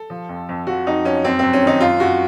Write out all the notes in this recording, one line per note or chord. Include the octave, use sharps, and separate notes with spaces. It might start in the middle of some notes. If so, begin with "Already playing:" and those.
Already playing: A4
F3
F2
F2
F3 F#4
F2 D#4
F2 C#4
F#2 C4
F#2 C4
C#4
D#3 D#4
F#2 F4
F#2 F#4